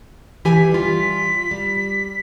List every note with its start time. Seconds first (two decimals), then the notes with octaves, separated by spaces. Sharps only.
0.45 E3 G4 G#5 B6
0.71 G3 F4
1.51 G3